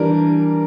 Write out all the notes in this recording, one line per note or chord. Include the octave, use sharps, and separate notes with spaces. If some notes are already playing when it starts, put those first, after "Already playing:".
Already playing: E3 G3 D4 A#4